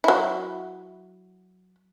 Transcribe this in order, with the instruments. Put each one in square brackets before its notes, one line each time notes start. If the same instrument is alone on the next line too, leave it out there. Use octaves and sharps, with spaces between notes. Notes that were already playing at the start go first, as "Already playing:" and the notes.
[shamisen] F#3 E4